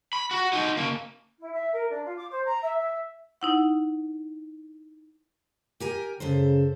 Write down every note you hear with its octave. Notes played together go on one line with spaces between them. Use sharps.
B5
F#4
D#4 F#4
C#3 A#3
E4
E5
A#4
D4
F4
D6
C5
A#5
E5
E5
D#4 E4 F#5
G4 A#4 G#5
F#2 C#3 A4 C5